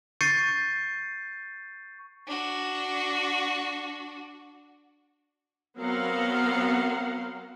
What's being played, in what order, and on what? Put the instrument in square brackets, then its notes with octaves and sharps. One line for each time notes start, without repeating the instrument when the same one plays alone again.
[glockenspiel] C#6 G6 A6 C7 C#7 D#7
[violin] D4 F#4
[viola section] F#3 B3 C4 A#4 F5 F#5